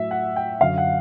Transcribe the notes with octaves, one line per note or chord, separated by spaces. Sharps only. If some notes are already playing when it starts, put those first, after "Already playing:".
Already playing: A2 F#3 E5
F#5
G5
F#2 D3 F#3 F5
F#5